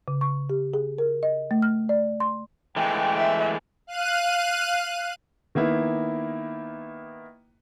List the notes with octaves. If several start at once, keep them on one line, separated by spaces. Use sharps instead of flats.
C#3
C#6
G4
G#4
A#4
D#5
A3
F6
D5
C6
E3 G#3 A3 G5
E5
F5 F#6 D#7
D#3 A#3 B3 E4